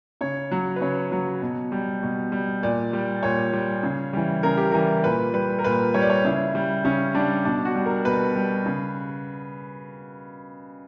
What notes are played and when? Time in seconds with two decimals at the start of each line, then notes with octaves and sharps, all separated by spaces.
0.21 C#3 C#5
0.51 F#3
0.76 B4
0.81 C#3 C#5
1.12 F#3
1.42 B2
1.72 G3
2.03 B2
2.32 G3
2.63 A#2 D5
2.93 G3
3.23 A#2 C#5
3.53 G3
3.83 C#3
4.13 E3 G3
4.43 C#3 A#4
4.57 G4
4.72 E3 G3 A#4
5.04 A#2 B4
5.34 G3 B4
5.59 A#4
5.64 A#2 B4
5.94 G3 C#5
6.02 D5
6.10 C#5
6.25 C#3 E4
6.55 G3
6.85 C#3 C#4
7.14 G3 D4
7.45 B2 D4
7.65 F#4
7.75 G3
7.86 A#4
8.05 B2 B4
8.36 G3
8.66 C#3